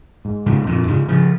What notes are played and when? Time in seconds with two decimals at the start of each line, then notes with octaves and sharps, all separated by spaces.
0.25 G#2
0.46 G#2 C#3
0.67 F2 A#2
0.88 G#2 C#3
1.08 C#3 F3